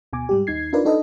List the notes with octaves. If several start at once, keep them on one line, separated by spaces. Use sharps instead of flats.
D2 B2 G#5 D6
G#2 G3 G4
D#2 D#4 G#6 C7
D4 D#4 F4 A#4 B4 D5
D4 D#4 A4 B4 D#5